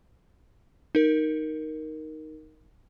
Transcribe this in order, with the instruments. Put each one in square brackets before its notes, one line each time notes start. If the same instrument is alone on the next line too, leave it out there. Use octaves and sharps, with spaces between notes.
[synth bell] D#4 A#4